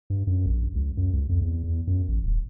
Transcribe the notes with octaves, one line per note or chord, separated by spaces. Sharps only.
G2
F#2
A#1
C#2
F#2
C#2
F2
E2
E2
F#2
A1
D#1